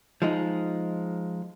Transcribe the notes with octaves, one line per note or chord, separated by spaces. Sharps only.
F3 G#3 D#4